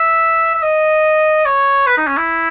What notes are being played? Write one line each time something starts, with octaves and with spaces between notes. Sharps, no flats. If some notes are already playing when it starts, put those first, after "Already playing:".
Already playing: E5
E5
D#5
C#5
B4
D#4
C#4
E4